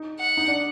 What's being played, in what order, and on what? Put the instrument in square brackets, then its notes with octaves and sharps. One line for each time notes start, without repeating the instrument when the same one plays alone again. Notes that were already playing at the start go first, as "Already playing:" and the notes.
Already playing: [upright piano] D#4
[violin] F#5
[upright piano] D#4
D4